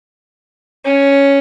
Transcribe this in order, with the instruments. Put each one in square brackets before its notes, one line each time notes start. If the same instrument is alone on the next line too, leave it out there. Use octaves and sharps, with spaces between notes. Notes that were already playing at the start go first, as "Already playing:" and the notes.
[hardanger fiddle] C#4